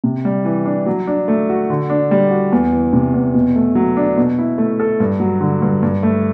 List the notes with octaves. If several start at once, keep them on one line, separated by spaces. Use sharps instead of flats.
C3
G3
E3
D4
F#3
D4
A3
F#4
D3
D4
G3
F#4
E2
E3
C3
E2
B2
A3
F#3
D4
B2
E4
A3
A4
G2
F#3
D3
G2
G2
A3